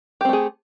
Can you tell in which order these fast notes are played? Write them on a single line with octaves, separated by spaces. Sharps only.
G4 C4 A3 G#4